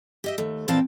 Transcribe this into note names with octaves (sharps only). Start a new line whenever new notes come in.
G4 D#5 E5
D#2 A3
A#2 E3 C4 F5 G5 A5